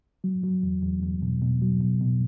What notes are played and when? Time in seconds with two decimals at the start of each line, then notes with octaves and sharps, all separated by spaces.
0.24 F#3
0.43 F#3
0.63 E2
0.83 E2
1.02 E2
1.22 B2
1.42 B2
1.62 F#3
1.81 B2
2.01 B2